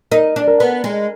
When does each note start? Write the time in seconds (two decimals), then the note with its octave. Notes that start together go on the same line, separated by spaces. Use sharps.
0.12 D#4 A#4
0.36 D4
0.48 A#4
0.60 B3
0.84 G#3